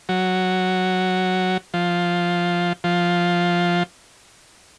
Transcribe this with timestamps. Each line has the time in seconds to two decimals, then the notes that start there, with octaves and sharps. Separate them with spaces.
0.09 F#3
1.74 F3
2.84 F3